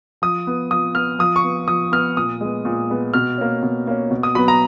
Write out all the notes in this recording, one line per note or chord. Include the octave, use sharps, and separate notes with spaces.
F3 D#6
B3
F3 D#6
B3 F6
F3 D#6
C#6
B3
F3 D#6
B3 F6
A#2 D#6
G#3 B3
A#2
G#3 B3
B2 F6
A#3 C#4
B2
A#3 C#4
B2
D#6
F#3 B3 B5
A#5